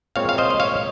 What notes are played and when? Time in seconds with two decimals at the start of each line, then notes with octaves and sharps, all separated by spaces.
0.16 A#2 G#3 C4 C#5 F5
0.29 F5
0.38 C5 D#5
0.50 D#5
0.60 C#5 F5